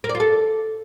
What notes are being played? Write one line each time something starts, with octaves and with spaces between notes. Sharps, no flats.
A#4
D5
F4
A4